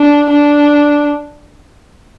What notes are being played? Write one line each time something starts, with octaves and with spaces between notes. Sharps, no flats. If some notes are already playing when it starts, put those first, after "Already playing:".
Already playing: D4
D4